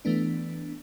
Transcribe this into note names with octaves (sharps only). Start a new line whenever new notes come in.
E3 A3 B3 D4